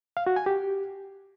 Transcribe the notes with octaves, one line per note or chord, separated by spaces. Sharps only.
F5
F#4
G#5
G4